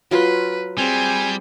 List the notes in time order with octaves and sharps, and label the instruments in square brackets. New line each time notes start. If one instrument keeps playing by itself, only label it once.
[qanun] F#3 F4 C6 [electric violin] B4
[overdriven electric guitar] G3 [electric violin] C4 G#4 [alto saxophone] G#5